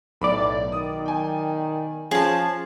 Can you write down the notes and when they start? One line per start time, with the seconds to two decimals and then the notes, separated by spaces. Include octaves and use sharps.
0.21 B1 A2 D5 B5
0.72 D#3 D#6
1.05 G5 G#5
2.11 F3 C#4 G#4 A5